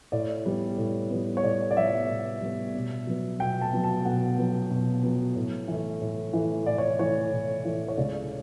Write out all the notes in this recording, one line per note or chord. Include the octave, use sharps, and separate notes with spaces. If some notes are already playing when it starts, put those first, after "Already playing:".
A2 D5
G3 B3
A2
G3 B3
C#5
A2 D5
D5
G3 B3 E5
A2
G3 B3
B2
F#3 B3
B2 G5
A5
F#3 B3
A5
B2 F#5
F#3 B3
B2
F#3 B3
A2
E3 A3
A2
E3 A3
A2 D5
C#5
E3 A3 C#5
A2
E3 A3
C#5
C#2 D5